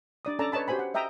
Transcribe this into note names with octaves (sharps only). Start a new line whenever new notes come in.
D4 D5 D#6
C#4 A4 D5 A5 A#5
B4 C#5 D#5 A5 B5
F#4 G4 C5 G#5 B5
F#5
D#5 E5 G5 A#5 D#6